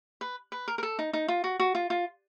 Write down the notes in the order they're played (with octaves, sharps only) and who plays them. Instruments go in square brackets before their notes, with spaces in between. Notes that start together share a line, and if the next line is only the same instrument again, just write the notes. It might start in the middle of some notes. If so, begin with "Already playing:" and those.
[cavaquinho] B4
B4
A#4
A#4
A4
D#4
D#4
F4
F#4
F#4
F4
F4